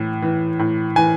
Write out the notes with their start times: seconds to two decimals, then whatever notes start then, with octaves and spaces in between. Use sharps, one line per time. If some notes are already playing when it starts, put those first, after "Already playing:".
Already playing: A2 E3
0.22 E3
0.59 A2
0.96 E3 G#5